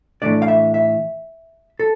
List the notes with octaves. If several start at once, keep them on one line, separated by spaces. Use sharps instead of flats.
A2 E3 A3 D4 D5
F5
E5
E5
A4